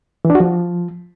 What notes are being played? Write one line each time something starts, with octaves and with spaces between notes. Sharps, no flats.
E3
D4
F#4
F3